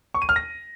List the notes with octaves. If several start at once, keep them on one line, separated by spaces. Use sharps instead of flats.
C#6
D#7
F6
A#6